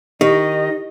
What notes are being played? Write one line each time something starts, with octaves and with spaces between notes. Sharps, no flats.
D#3 D#4 G4 D#5